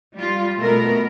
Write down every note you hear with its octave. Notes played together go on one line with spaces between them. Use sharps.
G3 F4
B2 A3 B3 A#4